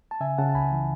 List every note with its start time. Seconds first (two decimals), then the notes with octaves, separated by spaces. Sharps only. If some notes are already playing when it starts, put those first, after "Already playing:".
0.11 A5
0.21 C#3 E5 G#5
0.38 C#3 F#5 A5
0.49 A5
0.54 C#2 G#5 B5
0.72 E3